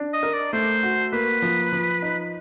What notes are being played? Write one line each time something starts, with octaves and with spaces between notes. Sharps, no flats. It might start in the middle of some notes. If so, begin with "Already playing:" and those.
Already playing: D4
D#5
A#4
D5
A3 C5
F#4
A#3 B4
F3
F3
D#4